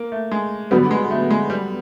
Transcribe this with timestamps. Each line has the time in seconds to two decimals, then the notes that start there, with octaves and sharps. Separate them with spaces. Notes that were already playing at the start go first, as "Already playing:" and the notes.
Already playing: A#3
0.12 A3
0.32 G#3
0.71 D3 F#3 G3 B3
0.91 G#3
1.11 A3
1.31 G#3
1.50 G3